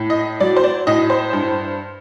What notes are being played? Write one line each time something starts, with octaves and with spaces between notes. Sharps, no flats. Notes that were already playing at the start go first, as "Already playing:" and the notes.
Already playing: A2
D#5
F#3 D5
C5
D5
A2 D#5
C5
G2